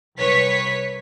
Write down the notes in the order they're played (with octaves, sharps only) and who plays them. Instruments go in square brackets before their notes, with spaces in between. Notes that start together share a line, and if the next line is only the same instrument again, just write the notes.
[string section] C2 B4 C#5 B6